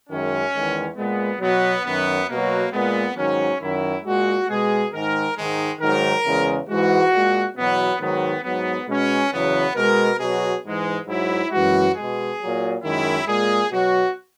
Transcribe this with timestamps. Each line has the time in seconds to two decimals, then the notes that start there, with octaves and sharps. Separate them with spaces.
0.09 F#2 D#3 G#3 C#4
0.53 E2 D#3 G#3
0.96 A#2 G#3 B3
1.40 B2 F#3 B3
1.84 F#2 D#3 F#3 B3
2.28 B2 F#3 A#3
2.72 A#2 G#3 B3
3.16 G#2 D#3 F#3 C#4
3.60 F#2 D#3 F#3 E4
4.04 A#2 G#3 F#4
4.48 B2 G#3 G#4
4.92 G#2 D#3 G#3 A#4
5.36 G#2 D#3 G#3
5.80 G#2 D#3 F#3 A#4
6.24 E2 C#3 G#3
6.68 G#2 E3 G#3 F#4
7.11 A#2 G#3
7.56 E2 B2 F#3 B3
7.99 G#2 D#3 F#3 B3
8.43 G#2 F#3 B3
8.87 B2 G#3 C#4
9.31 E2 C#3 F#3 B3
9.75 B2 G#3 A#4
10.18 B2 F#3 G#4
10.63 G#2 E3 G#3
11.06 G#2 F#3 E4
11.50 F#2 E3 G#3 F#4
11.94 B2 G#3 G#4
12.39 A#2 F#3
12.82 F#2 D#3 G#3 E4
13.26 A#2 G#3 G#4
13.70 B2 F#3 F#4